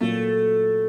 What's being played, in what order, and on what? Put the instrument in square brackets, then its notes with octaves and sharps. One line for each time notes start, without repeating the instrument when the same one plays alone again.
[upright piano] A#2 F#3 A#3 F#4 [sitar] A3